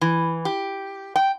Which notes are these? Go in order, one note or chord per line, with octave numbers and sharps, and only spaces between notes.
E3
G4
G5